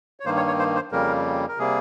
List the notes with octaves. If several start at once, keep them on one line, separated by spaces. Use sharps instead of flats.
C#5
G2 D#3 A#3 C5
C#5
C#5
C5
C5
F2 C#3 G3 A#3 A#4
A#4
C3 G3 A#3 G#4